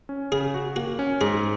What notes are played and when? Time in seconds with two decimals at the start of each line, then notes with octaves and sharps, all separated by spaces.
0.09 C#4
0.32 C#3 G#4
0.54 F#4
0.76 A#3 F#4
0.99 C#4
1.21 G#2 G#4